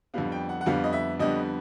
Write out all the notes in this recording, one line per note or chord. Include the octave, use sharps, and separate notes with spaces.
F2 D3 G3 B3 F5
G5
F#5
F#5
F2 D3 G3 B3 F5
D#5
E5
F2 D3 G3 B3 D#5